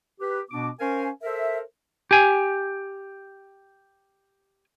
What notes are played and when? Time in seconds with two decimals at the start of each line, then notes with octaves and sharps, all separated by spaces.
0.21 G4 B4
0.51 B2 B3 D4 F#4 D6
0.80 C#4 A#4 C5 F5 G#5
1.23 A4 A#4 C5 E5
2.11 G4 G#5